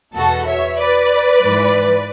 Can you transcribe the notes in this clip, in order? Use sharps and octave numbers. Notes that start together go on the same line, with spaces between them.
E2 B2 F#4 A4
C#5 E5
B4 D5
G#2 E3